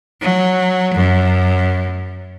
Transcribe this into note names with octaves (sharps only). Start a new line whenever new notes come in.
F#3
F#2